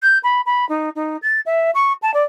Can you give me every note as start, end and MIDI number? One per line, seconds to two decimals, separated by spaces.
0.02 0.18 91
0.23 0.41 83
0.45 0.67 83
0.68 0.89 63
0.95 1.17 63
1.22 1.40 93
1.45 1.70 76
1.74 1.92 85
2.02 2.13 81
2.13 2.23 74